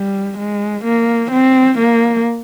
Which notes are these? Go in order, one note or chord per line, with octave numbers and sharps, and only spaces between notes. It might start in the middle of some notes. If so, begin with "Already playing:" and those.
Already playing: G3
G#3
A#3
C4
A#3